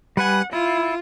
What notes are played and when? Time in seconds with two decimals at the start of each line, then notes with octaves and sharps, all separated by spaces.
0.17 G3 B4 F#5 G#5
0.53 E4 F4